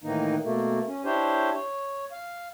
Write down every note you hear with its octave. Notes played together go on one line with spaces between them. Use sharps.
A2 D#3 E3 A#3 D#4
B2 A3 A#3
C#4
D4 E4 G4 C5 C#5
C#5
F5